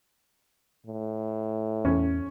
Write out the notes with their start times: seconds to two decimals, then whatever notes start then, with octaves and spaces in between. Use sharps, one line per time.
0.86 A2
1.85 E2 C#4